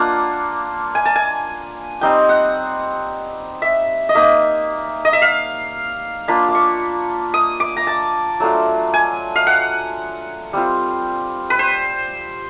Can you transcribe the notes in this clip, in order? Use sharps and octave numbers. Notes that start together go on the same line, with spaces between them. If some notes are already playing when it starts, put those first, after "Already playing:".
Already playing: A#3 D4 F4 F#5
G#5
A5
G#5
G3 C4 D#4 G5
F#5
E5
D#5
A#3 D#4 E5
D#5
E5
F5
A#3 D4 F4 B5
D6
C#6
D#6
D6
A#5
A5
F#3 A3 D4 F4
G#5
F5
F#5
G3 C4 F4
B4
C5